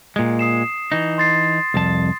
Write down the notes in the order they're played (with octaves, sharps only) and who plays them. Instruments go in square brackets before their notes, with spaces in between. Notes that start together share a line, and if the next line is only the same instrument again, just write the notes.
[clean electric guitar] A#2 G#3
[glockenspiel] D#6 C7 E7
[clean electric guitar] E3 D#4
[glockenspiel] C6 A6 C7
[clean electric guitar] C2 F2 A5